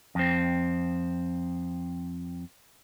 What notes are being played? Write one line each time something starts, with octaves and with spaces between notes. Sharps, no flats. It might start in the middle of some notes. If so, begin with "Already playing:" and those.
F2 C4